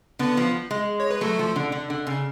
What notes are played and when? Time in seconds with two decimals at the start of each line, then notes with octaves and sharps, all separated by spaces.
0.19 D3 B3 B4
0.37 F3
0.71 G#3
1.00 C#5
1.11 B4
1.21 F#3 A3 A4
1.39 F3
1.56 D3
1.72 D3
1.90 D3
2.07 C#3